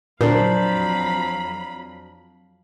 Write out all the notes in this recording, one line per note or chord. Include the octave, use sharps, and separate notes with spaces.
F2 A#2 F#3 D4 C5 F5 A#5 B5